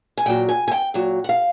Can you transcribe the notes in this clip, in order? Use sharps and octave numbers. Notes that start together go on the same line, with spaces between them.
G#5
A#2 F#3 G5
G#5
G#5
G5
A#2 F#3
F#5
F5